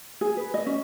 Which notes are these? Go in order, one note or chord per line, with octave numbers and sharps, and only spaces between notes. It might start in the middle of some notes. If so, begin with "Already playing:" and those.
G#4
B4
D#5
C#4